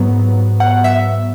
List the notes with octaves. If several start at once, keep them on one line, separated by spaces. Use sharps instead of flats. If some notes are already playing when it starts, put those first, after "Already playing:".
Already playing: G#2 F#3 B3
F#5
E5